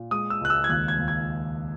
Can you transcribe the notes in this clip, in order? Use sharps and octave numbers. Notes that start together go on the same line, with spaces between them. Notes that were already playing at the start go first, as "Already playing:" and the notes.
Already playing: A#2
G#3 D#6
E6
C#2 F#6
E6
G#6
D#2 F#6
G#6
D#2
G#6